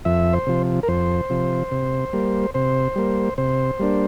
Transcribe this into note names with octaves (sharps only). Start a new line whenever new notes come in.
F2 E5
C5
C3 F3
A#4
F2 C5
C3 F3
C3
G3 A#3
C3 C5
G3 A#3
C3 C5
G3 A#3 D4